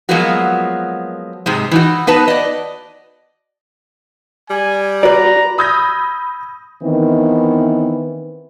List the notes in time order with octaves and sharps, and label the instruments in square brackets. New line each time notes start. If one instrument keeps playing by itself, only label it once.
[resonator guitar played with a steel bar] F3 F#3 G#3 A#3 B3 F#4
G#2 C3 G#3
E3 D#4 F#4
B3 D#4 B4 A5
D5 D#5
[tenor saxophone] G3 [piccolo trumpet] G#5
[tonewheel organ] F#4 [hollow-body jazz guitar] B4 D5 [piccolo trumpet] A#5
[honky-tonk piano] B5 D#6 E6 G6 G#6 A#6
[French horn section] D#3 E3 B3 C4